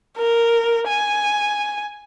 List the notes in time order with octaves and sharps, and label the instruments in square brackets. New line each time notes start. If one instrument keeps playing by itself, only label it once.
[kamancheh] A#4
G#5